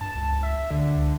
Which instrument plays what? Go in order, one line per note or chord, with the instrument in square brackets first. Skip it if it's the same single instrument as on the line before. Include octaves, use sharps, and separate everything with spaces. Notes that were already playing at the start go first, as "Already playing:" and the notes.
[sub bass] G2 [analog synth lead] A5
[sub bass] C#2
[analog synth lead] E5
[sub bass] D2 [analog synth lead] D3
[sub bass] C#2